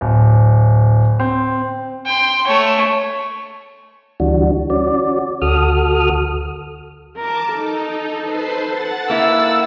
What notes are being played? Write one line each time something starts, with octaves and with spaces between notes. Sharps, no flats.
D1
C4
G5 C6
A3 C#5
D2 E3 G3 D4 F#4
C#4 F#4 D5
D2 F#4 A4 D#6 F6
A#4 A5 D6
D#4 A4
B4 C5 C6
F#5 A6
A#3 E4 E6